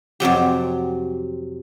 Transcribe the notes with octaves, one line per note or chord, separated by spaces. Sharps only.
F2 C3 F#3 G4